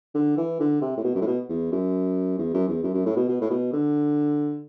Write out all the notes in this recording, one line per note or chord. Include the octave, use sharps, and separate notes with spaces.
D3
E3
D3
C3
A2
B2
F#2
A2
B2
E2
F#2
E2
F#2
E2
F#2
F#2
A2
B2
B2
A2
B2
D3